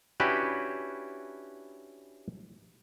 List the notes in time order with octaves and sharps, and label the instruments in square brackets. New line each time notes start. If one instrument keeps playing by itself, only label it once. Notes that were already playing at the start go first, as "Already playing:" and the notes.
[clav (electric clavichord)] C#4 D4 E4 F#4 G4 B4